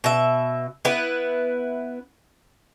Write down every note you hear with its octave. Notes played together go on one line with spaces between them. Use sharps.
B2 E5
B3 E4 B4